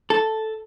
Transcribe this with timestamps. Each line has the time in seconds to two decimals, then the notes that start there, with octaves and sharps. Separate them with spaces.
0.10 A4